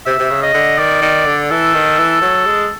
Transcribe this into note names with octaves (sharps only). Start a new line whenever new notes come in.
C3 E5
C3
C#3
D#5
D3
D#3 D5
D#3
D3
E3 A4
D#3
E3
F#3
G#3